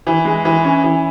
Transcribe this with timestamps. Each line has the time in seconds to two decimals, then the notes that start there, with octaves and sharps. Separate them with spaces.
0.07 E3
0.25 G#3
0.45 E3
0.64 C#4
0.84 E3